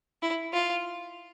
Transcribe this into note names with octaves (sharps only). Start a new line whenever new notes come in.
E4
F4